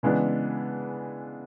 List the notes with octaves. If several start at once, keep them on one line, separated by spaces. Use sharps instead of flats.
C#3 E3 G#3 B3 D4